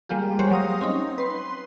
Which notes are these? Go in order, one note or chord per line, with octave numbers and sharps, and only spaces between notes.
G3 G#3 A#3 F4 G4
G#3 A#3 F#4 G4 C5 C#5
F#3 F5 D#6 A#6
C4 C#4 D#4
B4 C6